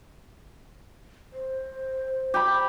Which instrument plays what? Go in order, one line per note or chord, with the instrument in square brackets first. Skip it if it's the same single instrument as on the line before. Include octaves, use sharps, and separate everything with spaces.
[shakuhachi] C5
[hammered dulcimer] G4 B5